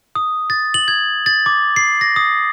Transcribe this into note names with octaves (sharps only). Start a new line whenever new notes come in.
D#6
A6
F#7
G#6
A6
D6
C7
A#6
D#6